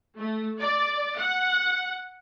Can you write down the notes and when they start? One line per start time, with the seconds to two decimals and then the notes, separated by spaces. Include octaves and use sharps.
0.17 A3
0.60 D5
1.18 F#5